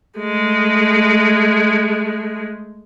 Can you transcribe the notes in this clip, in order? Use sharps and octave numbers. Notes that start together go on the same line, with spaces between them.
G#3 A3